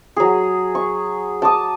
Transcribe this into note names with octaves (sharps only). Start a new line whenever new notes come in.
F#3 G#4
C#6
A5 D6 D#6